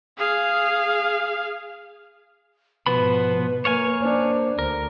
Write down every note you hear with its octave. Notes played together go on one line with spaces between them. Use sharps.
G#4 F5
G#2 B2 F3 B3 B4 B5
B2
A#3 C#5 F5 G#5
A#3 D4 C5
D2 A#4